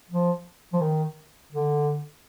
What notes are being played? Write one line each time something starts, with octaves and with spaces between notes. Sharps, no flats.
F3
F3
D#3
D3